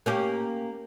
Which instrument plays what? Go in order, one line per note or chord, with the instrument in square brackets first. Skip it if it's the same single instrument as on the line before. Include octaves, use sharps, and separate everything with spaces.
[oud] A#3 C#4 G4